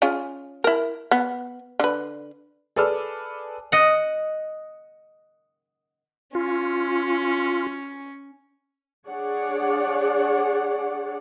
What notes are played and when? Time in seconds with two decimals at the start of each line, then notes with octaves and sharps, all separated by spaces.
0.02 C#4 F4 G#4
0.64 E4 A#4
1.11 B3
1.80 D3 B4
2.76 G#4 A4 B4 D5 E6 F6
3.72 D#5 F#5
6.35 C#4 F4
9.08 D4 G#4 C#5 D5 F#5